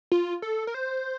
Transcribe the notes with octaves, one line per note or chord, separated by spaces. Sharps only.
F4
A4
A#4
C5